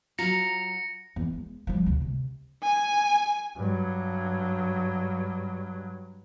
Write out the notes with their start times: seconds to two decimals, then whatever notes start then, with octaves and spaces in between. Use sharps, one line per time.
0.19 F#3 F4 A#5 A#6 C#7
1.16 E2
1.33 G#3
1.67 F3 G3
1.86 D2 B2
2.02 C3
2.63 G#5
3.57 G2 F#3